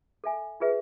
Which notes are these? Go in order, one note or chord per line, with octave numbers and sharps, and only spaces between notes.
A4 E5 G#5
F4 G#4 B4 E5